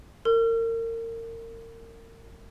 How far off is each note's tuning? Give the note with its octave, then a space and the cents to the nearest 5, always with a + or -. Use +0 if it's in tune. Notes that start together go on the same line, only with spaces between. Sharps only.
A#4 -30